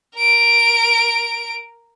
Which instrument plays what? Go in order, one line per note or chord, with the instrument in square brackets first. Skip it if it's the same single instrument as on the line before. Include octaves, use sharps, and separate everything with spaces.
[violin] A#4 D7